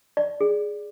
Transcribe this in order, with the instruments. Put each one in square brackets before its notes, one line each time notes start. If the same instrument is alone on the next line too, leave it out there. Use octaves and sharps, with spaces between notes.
[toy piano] D5
G#4